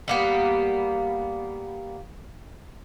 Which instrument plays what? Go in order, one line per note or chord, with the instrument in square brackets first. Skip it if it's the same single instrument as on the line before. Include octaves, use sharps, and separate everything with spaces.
[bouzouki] G3 A#3 B3